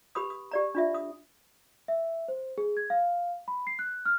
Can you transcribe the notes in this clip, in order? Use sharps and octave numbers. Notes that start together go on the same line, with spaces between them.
G4 B4 B5 D#6
D#6
G4 D5 A#5
D4 F4 E5
D#6
E5
C5
G#4
G#6
F5
B5
C7
F#6
F6